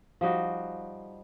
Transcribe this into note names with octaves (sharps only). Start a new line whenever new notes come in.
F3 G3 D#4 F#4